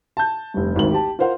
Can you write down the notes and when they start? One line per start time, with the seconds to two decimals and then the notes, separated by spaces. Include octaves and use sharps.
0.17 A5 G6
0.54 F1 G2
0.76 G#1 D2 D#3 F#7
0.92 G4 A5
1.19 F4 A#4 C5 F5 F#5